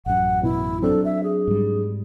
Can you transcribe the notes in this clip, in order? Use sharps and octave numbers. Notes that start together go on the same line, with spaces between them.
A1 F#2 F#5
B2 E4
F#3 C4 D4 A4
E5
G#4
G#2 G3